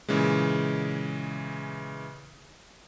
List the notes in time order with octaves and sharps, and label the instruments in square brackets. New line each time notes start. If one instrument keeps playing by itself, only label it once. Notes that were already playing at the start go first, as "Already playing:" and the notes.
[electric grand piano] A#2 C#3 E3 G#3